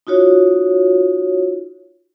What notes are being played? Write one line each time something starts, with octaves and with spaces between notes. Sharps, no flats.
D#4 F4 F#4 C#5